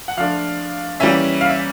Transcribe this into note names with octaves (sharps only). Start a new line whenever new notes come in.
F#5
F3 A3 D4 F5
E3 G3 A#3 C#4 E4 E5
F5
E5